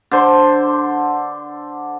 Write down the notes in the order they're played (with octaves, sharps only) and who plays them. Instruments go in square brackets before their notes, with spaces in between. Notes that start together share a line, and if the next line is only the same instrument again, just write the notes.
[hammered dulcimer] D3 C5